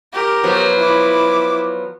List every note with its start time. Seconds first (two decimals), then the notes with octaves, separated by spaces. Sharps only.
0.13 G4 A#4
0.44 F3 F#3 B3
0.77 E4 D6